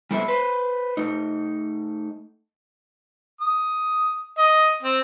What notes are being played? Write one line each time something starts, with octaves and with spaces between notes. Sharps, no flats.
G3 B3 E4 A4 C5 E5
B4 C5
A3 D#4
D#6
D#5
C4